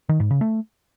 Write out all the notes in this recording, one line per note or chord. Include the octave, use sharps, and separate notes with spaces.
D#3
G#2
C#3
A3